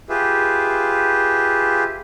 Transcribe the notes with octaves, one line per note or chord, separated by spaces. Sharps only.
F4 G4 G#4 B4 E5